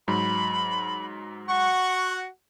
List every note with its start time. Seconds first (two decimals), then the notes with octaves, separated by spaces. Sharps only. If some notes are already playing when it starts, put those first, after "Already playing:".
0.08 G#2 F#3 B5
1.48 F#4 F#5 C#6